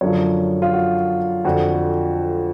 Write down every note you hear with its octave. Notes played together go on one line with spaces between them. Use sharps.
F#2 D3 F3 C#5
F4
F#4
F2 D3 F3 F#4